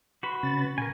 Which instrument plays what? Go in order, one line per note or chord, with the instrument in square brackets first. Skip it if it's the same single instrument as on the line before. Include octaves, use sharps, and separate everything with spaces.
[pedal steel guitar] F#4 B4 [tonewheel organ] C6
[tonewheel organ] C#3 C#4 A6
[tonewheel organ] A#2 [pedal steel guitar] A#4 G#5